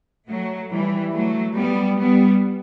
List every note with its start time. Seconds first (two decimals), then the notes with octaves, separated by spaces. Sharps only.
0.28 F#3 A3
0.70 E3 G3
1.12 F#3 A3
1.55 G3 B3
1.97 G3 B3